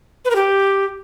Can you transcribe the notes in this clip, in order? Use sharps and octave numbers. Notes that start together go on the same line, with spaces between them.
B4
A#4
G4